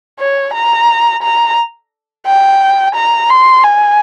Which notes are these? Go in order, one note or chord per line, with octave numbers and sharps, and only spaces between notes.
C#5
A#5
A#5
G5
A#5
C6
G#5